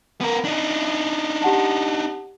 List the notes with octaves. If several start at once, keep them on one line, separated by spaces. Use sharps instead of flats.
B3 A#4
D4 D#4
G4 F#5 A5